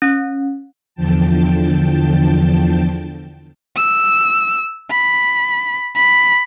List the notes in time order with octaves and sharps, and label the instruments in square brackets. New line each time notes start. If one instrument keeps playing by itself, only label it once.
[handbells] C#4
[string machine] E2 D3 F3 G5 A5
[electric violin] E6
B5
B5